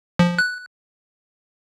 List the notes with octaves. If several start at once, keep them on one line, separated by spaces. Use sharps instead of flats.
F3
F#6